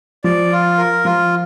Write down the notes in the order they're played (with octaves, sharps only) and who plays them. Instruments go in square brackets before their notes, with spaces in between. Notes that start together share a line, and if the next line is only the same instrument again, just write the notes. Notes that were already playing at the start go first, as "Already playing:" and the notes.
[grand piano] F3 [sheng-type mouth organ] D5
[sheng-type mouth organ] F4
A#4
[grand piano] F3 [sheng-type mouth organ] F4